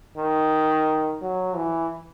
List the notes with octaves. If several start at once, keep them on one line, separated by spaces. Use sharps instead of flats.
D#3
F#3
E3